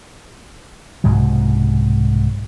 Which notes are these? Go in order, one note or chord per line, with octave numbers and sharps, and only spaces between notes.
C2 G#2 B2 F#3